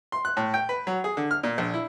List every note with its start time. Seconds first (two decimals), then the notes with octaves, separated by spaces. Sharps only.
0.12 C6
0.25 F#6
0.37 A2
0.54 G5
0.69 B4
0.87 F#3
1.04 G#4
1.17 D3
1.31 F6
1.43 A#2
1.58 A#1
1.74 E4